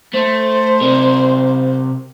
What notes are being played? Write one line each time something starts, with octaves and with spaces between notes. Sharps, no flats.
A3 C5
C3 A#4